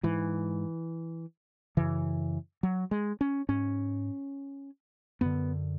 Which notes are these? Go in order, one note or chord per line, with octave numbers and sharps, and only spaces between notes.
G#2 E3
F#2 C#3 E3
F#3
G#3
C#4
G#2 C#4
F#2 D3 B3